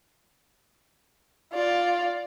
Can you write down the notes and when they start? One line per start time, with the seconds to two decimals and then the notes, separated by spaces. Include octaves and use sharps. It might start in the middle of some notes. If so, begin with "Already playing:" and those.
1.53 F4 D5